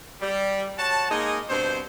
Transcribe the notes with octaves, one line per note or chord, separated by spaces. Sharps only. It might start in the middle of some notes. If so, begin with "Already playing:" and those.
G3
F#4 C#5 A5
G#3 A#3 D#4 D#5 G#5
G2 B2 C4 C5